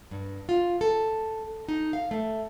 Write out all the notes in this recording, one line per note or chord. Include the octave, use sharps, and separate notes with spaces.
G2
F4
A4
D#4
F5
A3